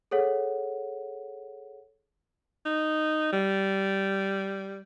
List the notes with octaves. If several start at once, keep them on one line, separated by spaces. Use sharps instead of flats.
G#4 A4 C#5 F#5
D#4
G3